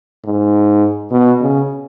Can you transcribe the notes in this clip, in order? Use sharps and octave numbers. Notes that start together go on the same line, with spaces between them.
G#2
B2
C#3